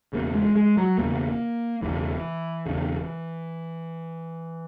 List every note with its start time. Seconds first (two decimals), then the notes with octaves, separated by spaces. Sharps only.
0.13 E1 E2 C#3 A#3
0.34 G#3
0.56 G#3
0.77 F#3
0.98 E1 E2 C#3 A#3
1.82 E1 E2 C#3 E3
2.66 E1 E2 C#3